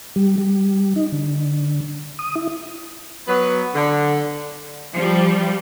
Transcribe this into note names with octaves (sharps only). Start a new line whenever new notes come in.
G3
G3
D#4
D3
D#6
E4
F#3 B3 B4
D3
F3 G3